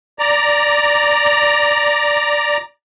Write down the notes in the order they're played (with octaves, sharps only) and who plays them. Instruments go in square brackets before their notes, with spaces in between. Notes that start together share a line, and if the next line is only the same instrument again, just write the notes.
[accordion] D5 A#5